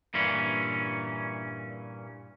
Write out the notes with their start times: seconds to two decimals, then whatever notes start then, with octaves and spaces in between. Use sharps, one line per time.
0.14 G2 A#2 E3 C#4